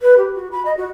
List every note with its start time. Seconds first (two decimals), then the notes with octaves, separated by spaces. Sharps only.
0.02 B4
0.17 G4
0.35 F#4
0.52 B5
0.65 D#5
0.77 F#4